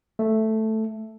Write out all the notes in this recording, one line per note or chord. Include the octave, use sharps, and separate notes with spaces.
A3